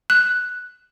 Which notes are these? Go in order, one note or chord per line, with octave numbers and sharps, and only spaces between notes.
F#6